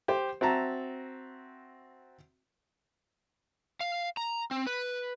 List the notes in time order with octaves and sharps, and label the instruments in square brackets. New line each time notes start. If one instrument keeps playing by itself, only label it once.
[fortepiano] G4 C5
C4 F#4 E5 A5 A#5
[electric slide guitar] F5
A#5
C4
B4